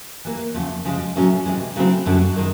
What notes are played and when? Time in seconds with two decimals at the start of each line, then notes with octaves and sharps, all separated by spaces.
0.25 E3 G3 A#3
0.54 E2 C#3 F3
0.85 C#3 F3 G#3
1.16 A2 F#3 A3 C#4
1.46 C3 E3 G#3
1.76 C#3 F#3 A3 C4 E4
2.06 F#2 D3 G3
2.36 D#3 G#3